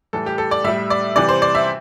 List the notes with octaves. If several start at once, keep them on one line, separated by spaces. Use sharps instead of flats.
A2 E3 G3 A4
G4
A4
D5
A2 G3 E5
D5
C3 E3 G3 D5
C5
D5
E5